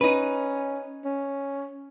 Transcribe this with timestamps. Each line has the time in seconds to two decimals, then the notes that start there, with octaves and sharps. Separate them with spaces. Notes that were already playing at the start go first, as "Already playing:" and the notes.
0.01 C#4 D#4 B4
1.05 C#4